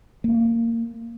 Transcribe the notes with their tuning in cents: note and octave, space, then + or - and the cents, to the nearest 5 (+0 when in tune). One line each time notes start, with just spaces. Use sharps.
A#3 -20